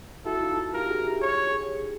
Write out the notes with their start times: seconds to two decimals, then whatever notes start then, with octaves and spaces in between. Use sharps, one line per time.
0.25 E4 F#4 A4
0.42 D#4 F4
0.73 F4 G4 A#4
0.90 F#4 G#4
1.05 G4
1.19 G#4 C#5
1.32 G4
1.47 G#4
1.61 G4
1.74 G#4